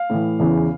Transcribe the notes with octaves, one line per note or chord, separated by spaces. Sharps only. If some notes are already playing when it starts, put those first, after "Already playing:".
Already playing: F5
A2 E3
E2 C#3 E3